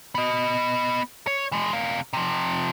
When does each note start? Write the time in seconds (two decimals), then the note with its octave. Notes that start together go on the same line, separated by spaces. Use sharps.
0.15 B3 D#5
1.27 C#5
1.52 E3 G#3
1.73 C3 F5
2.13 C3 F3